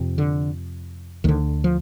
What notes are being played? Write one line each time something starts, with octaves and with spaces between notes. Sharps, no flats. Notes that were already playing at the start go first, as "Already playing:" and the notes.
Already playing: F2 C3
D3
D2 D3 D#3
F3